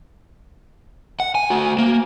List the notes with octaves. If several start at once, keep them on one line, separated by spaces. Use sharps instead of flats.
F#5
G#5
A3 F#4
A#3